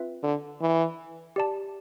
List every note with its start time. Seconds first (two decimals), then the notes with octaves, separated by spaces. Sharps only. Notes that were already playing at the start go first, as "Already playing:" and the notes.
Already playing: C4 F4 B4 E5
0.23 D3
0.61 E3
1.36 G4 D5 A5